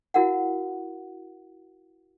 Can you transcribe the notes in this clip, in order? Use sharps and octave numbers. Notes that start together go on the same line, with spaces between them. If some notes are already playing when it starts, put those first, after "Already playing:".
E4 F#4 A#4 F5 F#5